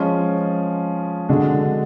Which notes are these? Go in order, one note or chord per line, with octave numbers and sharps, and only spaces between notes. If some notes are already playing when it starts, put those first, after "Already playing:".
Already playing: F3 G#3 C#4
D3 G#3 D4 F#4